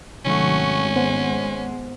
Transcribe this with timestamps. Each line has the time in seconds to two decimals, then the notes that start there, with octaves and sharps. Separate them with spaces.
0.25 G#1 C3 D#3 F#3 A3 C#4 F#4
0.96 G#3 B3 C5 F#5